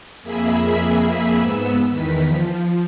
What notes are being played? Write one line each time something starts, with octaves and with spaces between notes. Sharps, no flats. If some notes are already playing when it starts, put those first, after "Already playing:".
F2 A#3 G#4 E5 B5 E6
G#2 B3 E6
E2 D#3 E3 B6
F3